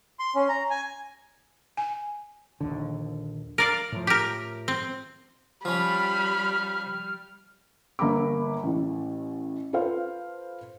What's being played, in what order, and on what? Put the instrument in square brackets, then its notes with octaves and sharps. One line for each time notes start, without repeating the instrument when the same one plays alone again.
[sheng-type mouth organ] C6
C#4
A#5
G#5
[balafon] G#5
[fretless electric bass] A#1 D#2 D3
[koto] A#4 D5 F5
[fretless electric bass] A2 F3
[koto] G4 A#4
C4
[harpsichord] F3 C#4 [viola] G3 [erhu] B5 [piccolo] F6
[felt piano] G1 A#3 A#5 B5 D6
A1 A2
F4 A4 B4 C5 F5